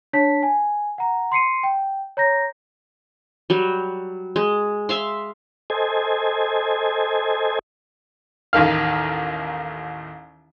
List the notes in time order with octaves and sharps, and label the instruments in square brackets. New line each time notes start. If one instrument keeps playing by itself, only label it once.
[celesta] D4 C#5 A5 B6
G#5
F#5 A#5
C6 C7 C#7 D#7
G5
C#5 A#5 G6 A#6
[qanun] F#3 G3
G#3
E5 F5 C6
[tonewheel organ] A4 C5 D#5 G#5
[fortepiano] A1 D#2 D#3 F5